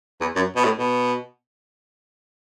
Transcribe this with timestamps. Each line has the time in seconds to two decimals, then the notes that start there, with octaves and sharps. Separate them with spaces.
0.21 E2
0.36 F#2
0.56 B2
0.65 A2
0.78 B2